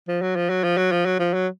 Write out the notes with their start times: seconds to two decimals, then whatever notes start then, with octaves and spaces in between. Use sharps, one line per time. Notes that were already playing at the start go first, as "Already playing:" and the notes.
0.08 F3
0.22 F#3
0.36 F3
0.50 F#3
0.64 F3
0.77 F#3
0.92 F3
1.06 F#3
1.19 F3
1.34 F#3